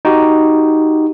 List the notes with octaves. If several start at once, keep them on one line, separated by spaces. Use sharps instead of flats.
D#4 F#4 G4